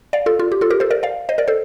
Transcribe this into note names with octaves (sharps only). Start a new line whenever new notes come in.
D5 F5
F4 A4
F4
G4
F4 A4
G4 A#4
A4 C5
A#4 D5
D5 F5
C5 D#5
A#4 D5
A4 C5